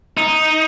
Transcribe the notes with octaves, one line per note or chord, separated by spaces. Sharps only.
D#4